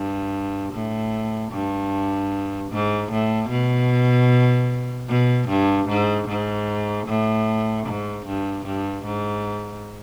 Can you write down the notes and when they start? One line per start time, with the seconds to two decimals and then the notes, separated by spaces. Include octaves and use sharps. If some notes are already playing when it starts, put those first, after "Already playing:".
Already playing: G2
0.73 A2
1.52 G2
2.71 G#2
3.11 A2
3.50 B2
5.09 B2
5.48 G2
5.89 G#2
6.29 G#2
7.07 A2
7.87 G#2
8.26 G2
8.66 G2
9.05 G#2